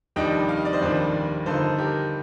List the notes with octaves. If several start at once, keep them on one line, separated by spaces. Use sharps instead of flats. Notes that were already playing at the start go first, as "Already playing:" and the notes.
F1 D#2 D#3 G3 D4 D#5 G5
F5
D#5
D5
C5 D#5
F1 D#2 D#3 G3 D4
G2 D3 F3 A#3 D#4 A4 C5
G4 A#4